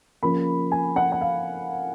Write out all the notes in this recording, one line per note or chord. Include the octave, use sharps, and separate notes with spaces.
C#3 F3 A#3 C#4 B5
G#5
F#5
F#5
F5